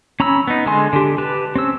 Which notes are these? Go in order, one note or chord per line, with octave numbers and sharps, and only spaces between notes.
C#4 A#5 B5 E6
B3 D#4
D3 G#3 G#5 C6
D3 G4
G4 B4 A5
C4 C#4 E6